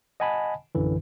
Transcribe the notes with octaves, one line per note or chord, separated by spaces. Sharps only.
D#5 F#5 G#5 A5 B5
A#1 F#2 D3 E3